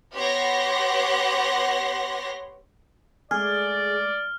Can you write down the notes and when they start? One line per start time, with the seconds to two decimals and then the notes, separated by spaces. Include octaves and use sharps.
0.16 B3 G4 C#5 F#5 C6 A#6
3.31 G#3 A3 G#4 D5 F6